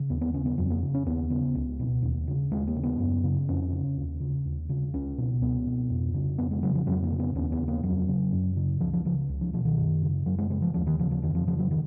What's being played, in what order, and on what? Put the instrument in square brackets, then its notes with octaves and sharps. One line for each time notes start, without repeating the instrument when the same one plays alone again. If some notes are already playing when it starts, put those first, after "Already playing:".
Already playing: [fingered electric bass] C#3
D#2 B3
B3
C#3 C#4
B3
F2 F#3
A#3
C#3
C#4
D#2 B3
C#3 B3
C#2
B2
D#2
C#3
D#2 G#3
A#3
C#3
B3
F#2
C#3
F2 C#4
C#3
D#2
C#3
D#2
C#3
C#2 C#4
B2
C#2 B3
B2
F2
C#3
F2 B3
G#3
C#3 F#3
F3
F2 F#3
A#3
C#3
B3
D#2 C#4
B3
C#3
A#3
F2 F#3
C#3
F#2
C#3
C#2 F3
F3
C#3 F3
C#2
F3
B2 F3
D#3
F#2
C#3
F#2 F#3
G#3
C#3 G#3
F3
D#2 F3
D#3
C#3 F3
F3
F2 D#3
F3
C#3 F3
F#3
D#3